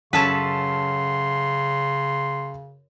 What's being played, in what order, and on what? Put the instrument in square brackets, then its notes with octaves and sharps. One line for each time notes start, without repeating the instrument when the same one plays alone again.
[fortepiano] F#2 A5 [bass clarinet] C#3 [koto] C#4 A4 B4 [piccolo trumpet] C6